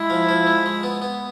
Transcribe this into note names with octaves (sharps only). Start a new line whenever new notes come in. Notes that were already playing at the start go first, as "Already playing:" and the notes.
Already playing: G#3 E4
F3
F3
G#3
G#3
B3
B3